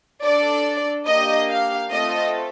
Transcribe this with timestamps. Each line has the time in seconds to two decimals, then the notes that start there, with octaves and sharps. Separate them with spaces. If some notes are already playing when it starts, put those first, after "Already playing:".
0.24 D4 A4 D5
1.06 A#3 D4 G4 D#5
1.48 F5
1.90 A3 C4 F4 A4 D#5